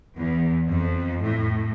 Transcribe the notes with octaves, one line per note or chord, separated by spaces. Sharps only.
E2
F2
A2